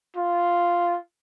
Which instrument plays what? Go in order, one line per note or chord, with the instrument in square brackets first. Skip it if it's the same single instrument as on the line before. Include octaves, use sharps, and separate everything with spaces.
[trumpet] F4